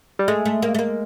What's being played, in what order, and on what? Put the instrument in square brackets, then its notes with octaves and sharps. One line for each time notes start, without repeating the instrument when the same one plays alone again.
[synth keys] G3
[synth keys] G#3 [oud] A3
[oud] A3
A#3
A3
A#3